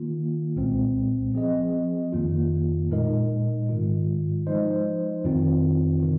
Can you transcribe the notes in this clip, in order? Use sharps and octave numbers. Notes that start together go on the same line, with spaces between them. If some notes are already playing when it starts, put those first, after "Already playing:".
Already playing: D#3 A#3 F4
C2 A#2 G#3 C4
F3 C4 G#4 D#5
F2 D#3 A#3 F4
A#2 G#3 D#4 A#4 D#5
G#2 D#3 G#3 F4
F3 G#3 D#4 C5 D#5
F2 D#3 C4 F4
C3 D#3